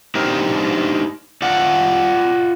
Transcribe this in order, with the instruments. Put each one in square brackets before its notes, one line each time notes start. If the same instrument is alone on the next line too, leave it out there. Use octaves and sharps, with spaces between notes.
[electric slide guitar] D4 D#4 G4 A#4 C5
F4 D5 F#5